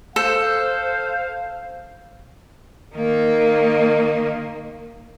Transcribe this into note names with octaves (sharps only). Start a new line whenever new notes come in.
A4 C5 F5
D#3 A#3